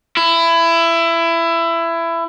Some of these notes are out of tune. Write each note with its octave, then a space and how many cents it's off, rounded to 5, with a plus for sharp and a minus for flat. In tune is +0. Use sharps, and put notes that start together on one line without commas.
E4 +20